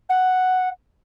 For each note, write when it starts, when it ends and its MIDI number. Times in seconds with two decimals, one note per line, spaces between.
0.09 0.69 78